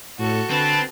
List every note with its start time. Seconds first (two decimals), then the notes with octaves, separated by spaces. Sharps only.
0.19 A2 F#4 A4
0.50 D3 C4 B4 A5